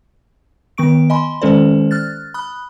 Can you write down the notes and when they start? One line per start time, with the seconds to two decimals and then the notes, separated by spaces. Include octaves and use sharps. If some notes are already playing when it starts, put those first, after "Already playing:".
0.78 D#3 B3 C#6 D7
1.10 D#5 G#5 B5 C6
1.42 D#3 G#3 C#4 A4 C5 D5
1.91 F6 F#6 A6
2.34 B5 D#6 F#6